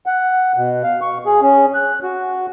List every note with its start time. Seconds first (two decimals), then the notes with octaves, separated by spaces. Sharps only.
0.06 F#5
0.57 B2
0.84 F5
1.02 C#6
1.26 G#4
1.42 C#4
1.74 F#6
2.03 F#4